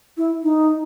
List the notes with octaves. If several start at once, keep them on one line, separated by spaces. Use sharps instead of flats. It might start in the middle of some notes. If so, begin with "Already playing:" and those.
E4
D#4